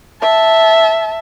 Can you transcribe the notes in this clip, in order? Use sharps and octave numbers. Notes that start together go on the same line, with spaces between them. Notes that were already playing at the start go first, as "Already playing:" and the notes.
E5 A5